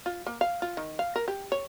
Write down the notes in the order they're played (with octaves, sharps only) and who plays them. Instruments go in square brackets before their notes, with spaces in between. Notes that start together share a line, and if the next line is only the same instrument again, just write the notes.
[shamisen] F4
A#3
F5
F4
D#3
F5
A#4
G4
C#5